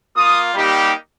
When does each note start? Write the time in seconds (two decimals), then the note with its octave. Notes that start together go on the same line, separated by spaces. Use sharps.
0.16 A#3 F4 D#6
0.54 G3 A#3 D#4 G4